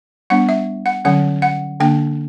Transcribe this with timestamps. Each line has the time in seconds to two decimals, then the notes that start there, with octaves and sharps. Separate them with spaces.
0.30 G3 B3 D4 F#5
0.49 E5
0.86 F#5
1.05 D3 F#3 C#4 F#5
1.42 F#5
1.80 D3 A#3 D4 G5